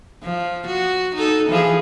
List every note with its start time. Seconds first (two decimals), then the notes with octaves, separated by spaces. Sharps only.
0.23 F3
0.67 F#4
1.15 D#4 A4
1.49 E3 F3 G#4